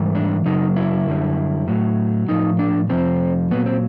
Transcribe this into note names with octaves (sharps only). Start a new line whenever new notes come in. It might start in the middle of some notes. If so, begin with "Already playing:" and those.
Already playing: G#2 E3 G3
D4
F#2 C#3 F#3 D#4
E4
F#2 D3 G3
A2 F#3
A2 F3 D#4
D4
F2 C3 F3 C4
A#2 F#3 B3
C4